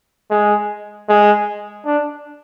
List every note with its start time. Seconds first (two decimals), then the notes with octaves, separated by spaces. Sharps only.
0.31 G#3
1.09 G#3
1.85 D4